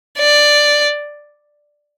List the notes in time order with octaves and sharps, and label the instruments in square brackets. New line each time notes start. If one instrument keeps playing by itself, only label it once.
[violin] D5